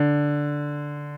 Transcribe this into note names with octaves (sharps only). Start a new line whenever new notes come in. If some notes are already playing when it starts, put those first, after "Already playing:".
Already playing: D3